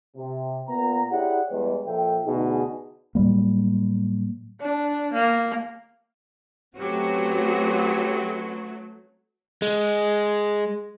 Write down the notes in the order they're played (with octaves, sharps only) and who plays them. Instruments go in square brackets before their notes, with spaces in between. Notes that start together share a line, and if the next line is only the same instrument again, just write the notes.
[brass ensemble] C3
A#2 B3 A#5
E4 G4 G#4 C#5 D5 F#5
E2 G2 G#3 B4
A#2 F3 A4 E5 G5
D2 B2 D#4 G#4
[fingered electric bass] A2 F#3 G3 A#3
[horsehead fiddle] D4
A#3
[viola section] F#3 A3 [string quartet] C4 C#4 B4 [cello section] F#4 [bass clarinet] G4
[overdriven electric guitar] G#3